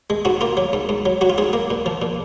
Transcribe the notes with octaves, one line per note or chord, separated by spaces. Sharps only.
G#3
G#2 F#4
A#3 F4
F#3
G#2
G#2
F#3
F#3 F#4
F4
G#2 G#4
A#3
A#2
F3
A#2